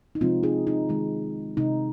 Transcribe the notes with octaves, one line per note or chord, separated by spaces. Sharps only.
D#4
C3 F3 G#3 C4 F4
D#4 G#4
D#4
D#3 G#3
C3 G#3 D#4